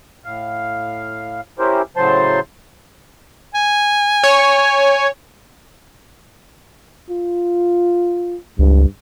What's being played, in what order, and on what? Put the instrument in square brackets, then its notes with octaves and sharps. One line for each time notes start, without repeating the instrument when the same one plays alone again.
[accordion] A2 F5
C#4 E4 G4 A#4 C5
A2 C#3 F#3 C5 A5 C6
[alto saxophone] G#5
[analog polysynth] C#5
[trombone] F4
[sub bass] C#2 [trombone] G2